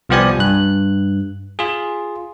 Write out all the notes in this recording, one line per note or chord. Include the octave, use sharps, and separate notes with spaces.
C2 F3 B3 G4 D5 G#5
G2 F#6
F4 G#4